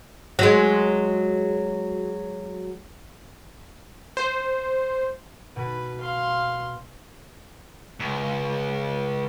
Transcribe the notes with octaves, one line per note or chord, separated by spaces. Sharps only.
F#3 G#3
C5
B2 B4
F5 C6
C#2